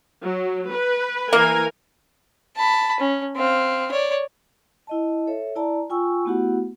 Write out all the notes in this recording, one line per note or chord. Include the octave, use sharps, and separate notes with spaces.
F#3
B4
E3 A#3 A#4 G#5
A5 B5
C#4
C4 F5
C#5 D5
E4 D#5 A5
A4 C#5 E5
E4 D5 A5 A#5
F4 G5 G#5 C#6 E6
A3 B3 E4 F#4 G4 F#5